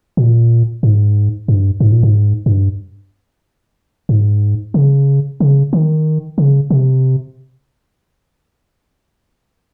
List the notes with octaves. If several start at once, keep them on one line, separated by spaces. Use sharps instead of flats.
A#2
G#2
G2
G#2
A#2
G#2
G2
G#2
C#3
C#3
D#3
C#3
C3